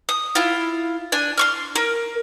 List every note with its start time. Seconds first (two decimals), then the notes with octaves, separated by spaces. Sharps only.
0.09 D#6
0.35 E4 F4
1.12 D4 G#5
1.38 C6 C#6 F6
1.75 A#4